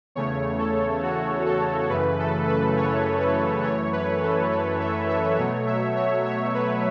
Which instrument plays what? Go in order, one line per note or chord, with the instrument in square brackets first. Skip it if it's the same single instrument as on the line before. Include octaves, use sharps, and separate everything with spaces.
[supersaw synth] E2 C#3 A3 C#5
A4
F#4
A4
F#2 C#3 E3 A3 B4
A4
B4
C#5
B4
F#2 E3 A3 C#5
B4
A4
B4
E5
E5
B2 F#3 A3 C#5
E5
C#5
C#5
B4